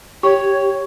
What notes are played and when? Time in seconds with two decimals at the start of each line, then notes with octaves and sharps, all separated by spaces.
0.23 G4 C#5 C#6